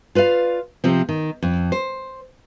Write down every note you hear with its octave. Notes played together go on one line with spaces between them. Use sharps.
F4 B4 D5 F5
C3 F3 C4
D#3
F2
C5